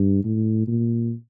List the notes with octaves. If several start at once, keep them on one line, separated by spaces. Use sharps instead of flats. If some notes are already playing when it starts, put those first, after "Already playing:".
Already playing: G2
A2
A#2